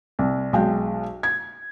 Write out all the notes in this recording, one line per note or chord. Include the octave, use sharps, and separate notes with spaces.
C2
B1 G#3 G5
G#6